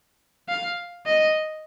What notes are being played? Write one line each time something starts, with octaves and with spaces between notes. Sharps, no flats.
F5
D#5